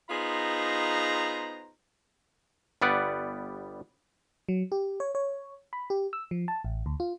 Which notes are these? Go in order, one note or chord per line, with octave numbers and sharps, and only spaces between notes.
B3 D#4 F4 G#4 C5 A#5
G1 G3 B3 D5 F#5
F#3
G4
C#5
C#5
B5
G4
E6
F3
A5
A1
D2
F4